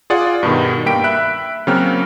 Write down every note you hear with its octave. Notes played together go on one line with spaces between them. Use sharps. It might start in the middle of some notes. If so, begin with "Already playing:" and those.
F4 G#4 D5 F#5 D6
G2 B2 D#3
G2 A#3 G5 B6 D7
E5 B5 F#6
C#3 F#3 A#3 C4 F6